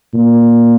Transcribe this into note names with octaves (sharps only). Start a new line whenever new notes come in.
A#2